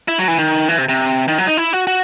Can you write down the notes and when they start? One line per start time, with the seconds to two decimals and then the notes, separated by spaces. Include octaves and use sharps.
0.08 E4
0.19 F#3
0.28 E3
0.39 D#3
0.69 E3
0.78 C3
0.89 C3
1.28 D#3
1.38 F#3
1.47 D#4
1.57 E4
1.73 F#4
1.87 F#4